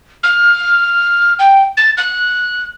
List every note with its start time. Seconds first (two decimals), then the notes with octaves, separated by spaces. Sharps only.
0.23 F6
1.39 G5
1.77 A6
1.97 F#6